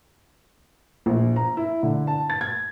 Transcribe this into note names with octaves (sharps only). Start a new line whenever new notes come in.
A#1
A#5
E4
D3
A5
A6
G#6